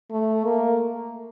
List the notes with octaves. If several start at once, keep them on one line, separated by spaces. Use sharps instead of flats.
A3
A#3